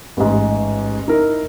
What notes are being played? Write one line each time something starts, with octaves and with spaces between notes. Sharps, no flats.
A1 G#2
D#4 E4 A#4